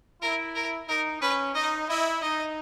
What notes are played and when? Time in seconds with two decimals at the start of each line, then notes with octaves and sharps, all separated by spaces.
0.22 E4 A#4
0.56 A#4
0.89 D#4 A#4
1.22 C#4 B4
1.55 D#4 D#5
1.88 E4 D#5
2.22 D#4 D#5